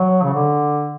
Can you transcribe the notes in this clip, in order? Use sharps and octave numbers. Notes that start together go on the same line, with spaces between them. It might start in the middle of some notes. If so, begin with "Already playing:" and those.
Already playing: F#3
C#3
D3